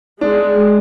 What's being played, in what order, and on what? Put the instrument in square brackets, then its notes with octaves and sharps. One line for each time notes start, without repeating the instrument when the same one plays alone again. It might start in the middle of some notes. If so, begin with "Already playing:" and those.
[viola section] G#3 [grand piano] D4